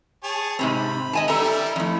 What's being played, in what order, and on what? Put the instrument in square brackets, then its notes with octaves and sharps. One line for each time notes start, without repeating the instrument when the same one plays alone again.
[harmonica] G#4 C#5 A5
[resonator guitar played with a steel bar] G#2 C3 C4 [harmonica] B5
[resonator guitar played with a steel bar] D#5 G#5 A5
[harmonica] G3 E4 E5 [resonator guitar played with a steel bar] A4 A#5
[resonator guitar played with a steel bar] F2 A2